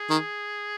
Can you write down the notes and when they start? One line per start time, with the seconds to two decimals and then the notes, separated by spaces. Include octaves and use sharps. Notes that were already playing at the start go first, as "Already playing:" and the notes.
Already playing: G#4
0.10 D#3